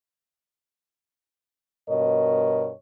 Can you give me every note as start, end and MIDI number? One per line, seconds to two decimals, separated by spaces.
1.89 2.72 43
1.89 2.72 47
1.89 2.72 70
1.89 2.72 73
1.89 2.72 75